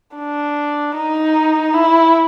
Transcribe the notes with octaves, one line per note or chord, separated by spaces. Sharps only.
D4
D#4
E4